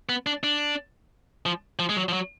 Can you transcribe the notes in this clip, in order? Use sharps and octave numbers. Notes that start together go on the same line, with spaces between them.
B3
D4
D4
F3
F3
G#3
F#3
F3
F#3